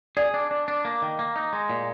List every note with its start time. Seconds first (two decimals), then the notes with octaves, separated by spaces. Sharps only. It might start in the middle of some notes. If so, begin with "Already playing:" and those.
0.17 G#4 D5
0.34 D4
0.51 D4
0.68 D4
0.85 A#3
1.02 D#3
1.19 A#3
1.36 D#4
1.53 G#3
1.70 A#2